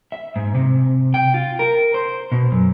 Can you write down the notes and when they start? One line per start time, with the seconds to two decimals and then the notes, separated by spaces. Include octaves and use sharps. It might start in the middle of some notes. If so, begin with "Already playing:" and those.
0.12 E5
0.36 G#2
0.55 C3
1.14 G5
1.34 F4
1.59 A#4
1.94 C5
2.32 B2
2.52 F#2